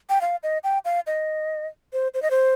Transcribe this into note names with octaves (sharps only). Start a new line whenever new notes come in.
G5
F5
D#5
G5
F5
D#5
C5
C5
D#5
C5